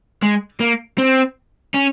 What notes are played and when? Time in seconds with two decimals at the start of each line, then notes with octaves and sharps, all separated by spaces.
0.22 G#3
0.60 A#3
0.98 C4
1.75 C#4